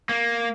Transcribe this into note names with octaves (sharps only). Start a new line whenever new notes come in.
A#3